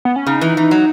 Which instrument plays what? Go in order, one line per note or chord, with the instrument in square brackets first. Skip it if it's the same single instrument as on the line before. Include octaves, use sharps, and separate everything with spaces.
[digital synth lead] B3
C#4
[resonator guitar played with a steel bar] C#3 [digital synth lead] D#4
[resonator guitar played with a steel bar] E3
E3
F#3